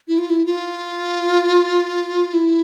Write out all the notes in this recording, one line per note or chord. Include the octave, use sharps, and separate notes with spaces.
E4
F4
E4
F4
E4